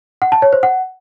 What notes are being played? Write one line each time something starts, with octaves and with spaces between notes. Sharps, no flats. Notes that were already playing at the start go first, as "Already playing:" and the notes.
F#5
A5
C#5
C5
F#5